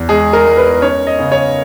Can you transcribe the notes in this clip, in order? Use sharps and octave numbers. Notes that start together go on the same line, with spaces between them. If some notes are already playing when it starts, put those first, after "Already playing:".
Already playing: E2
G#3 G#4
A#4
G#3
B4
C#4 C#5
D#5
C#3
C#5